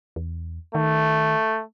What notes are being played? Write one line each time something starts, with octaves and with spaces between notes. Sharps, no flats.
E2
D#3 A3